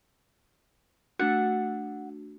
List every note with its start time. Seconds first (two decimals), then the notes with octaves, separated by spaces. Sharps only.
1.19 A3 D4 F#4 F#5